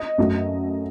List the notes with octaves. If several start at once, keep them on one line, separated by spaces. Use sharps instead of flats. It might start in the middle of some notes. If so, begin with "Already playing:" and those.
Already playing: D#5
F#2 F#3 A3